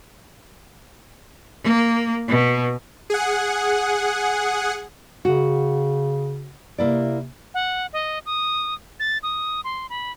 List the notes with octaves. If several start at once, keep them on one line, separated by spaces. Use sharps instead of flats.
A#3
B2
G#4 F#5
C#3 F#4
C3 A#3 E4 D5
F#5
D#5
D#6
A6
D#6
C6
B5